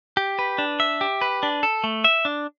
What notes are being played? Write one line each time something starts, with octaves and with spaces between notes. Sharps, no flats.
G4
B4
D4
E5
G4
B4
D4
A4
A3
E5
D4